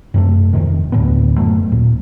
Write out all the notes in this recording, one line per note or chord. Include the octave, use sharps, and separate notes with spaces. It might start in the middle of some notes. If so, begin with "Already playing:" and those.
F#2 C3 A3
E1 F2 C3 D#3
D2 A2 F#3 B3
F#2 F#3 A3
D#2 A#2